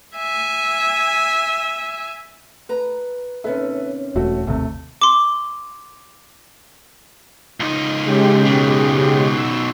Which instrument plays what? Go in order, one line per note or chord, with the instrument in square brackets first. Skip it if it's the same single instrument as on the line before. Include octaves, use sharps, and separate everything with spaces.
[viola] E5 G#5
[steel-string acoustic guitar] B4 A#5
[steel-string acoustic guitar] D#2 C3 C#4 [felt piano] A4 B4 E5
[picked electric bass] E1 [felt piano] F#3 A3 F#4
[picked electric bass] G#1 D#2 C3 [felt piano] A3
[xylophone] C6 D6
[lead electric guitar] C#2 D#4
[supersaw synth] C#3 G#3 G4
[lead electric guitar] B2 D#3
[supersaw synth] E6